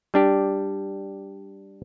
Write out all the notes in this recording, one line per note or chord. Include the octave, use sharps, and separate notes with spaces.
G3 D4 G4